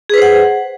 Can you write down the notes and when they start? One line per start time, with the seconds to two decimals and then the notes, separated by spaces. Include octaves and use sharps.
0.10 G#4
0.14 B4
0.18 C5
0.22 F#5